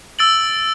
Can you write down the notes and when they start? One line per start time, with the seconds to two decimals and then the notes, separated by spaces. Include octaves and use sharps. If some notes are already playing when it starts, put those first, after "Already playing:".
0.19 E6 A6 D7 F#7